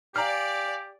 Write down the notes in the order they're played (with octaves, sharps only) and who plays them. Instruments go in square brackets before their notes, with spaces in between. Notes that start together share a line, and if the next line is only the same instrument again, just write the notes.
[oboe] G4 [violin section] D5 [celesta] F5 G#5 C7 [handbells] A#5 F6